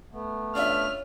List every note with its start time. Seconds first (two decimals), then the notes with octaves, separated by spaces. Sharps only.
0.12 A3 B3
0.55 C#3 C#4 D4 F4 E5 F6